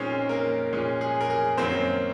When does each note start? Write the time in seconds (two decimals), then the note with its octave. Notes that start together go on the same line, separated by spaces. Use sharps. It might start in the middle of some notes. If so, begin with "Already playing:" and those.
Already playing: A#2 G#3 C4 C#4 D#4 C#5
0.29 A#3 A#4
0.73 A#2 G#3 C#4
1.01 G#4
1.21 A#4
1.30 G#4
1.58 F#2 D#3 F#3 A#3 C4 C#4 C5